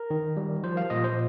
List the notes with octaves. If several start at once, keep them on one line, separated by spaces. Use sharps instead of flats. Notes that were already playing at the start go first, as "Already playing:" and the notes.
Already playing: A#4
D#3
G3
F3 C5
F5
A#2 D#5
C5